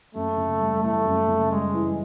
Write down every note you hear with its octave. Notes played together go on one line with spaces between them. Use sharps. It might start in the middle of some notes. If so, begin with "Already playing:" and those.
F#2 A3
C#3
G3
E3 A3
F#2
C#3
G3 G#3
E3